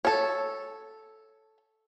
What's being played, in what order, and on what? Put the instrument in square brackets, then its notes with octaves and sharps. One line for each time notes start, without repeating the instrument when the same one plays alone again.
[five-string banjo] A4 C#5